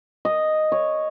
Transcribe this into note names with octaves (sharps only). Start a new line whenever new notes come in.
D#5
C#5